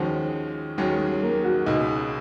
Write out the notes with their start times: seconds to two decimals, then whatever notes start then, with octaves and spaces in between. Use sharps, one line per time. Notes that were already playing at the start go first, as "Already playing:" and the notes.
Already playing: D#2 D#3 F3 G#3 C#4 F#4
0.78 D#2 D#3 F#3 G#3 C#4 F#4
1.00 F#3
1.22 A#3
1.44 F#4
1.66 C#2 B2 G#3 D#4